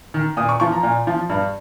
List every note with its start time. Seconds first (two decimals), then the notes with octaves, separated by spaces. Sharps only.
0.14 D#3
0.37 A#2 D#6
0.49 C#6
0.60 F3 C#6
0.72 A#5
0.83 A#2
1.07 F3
1.30 G2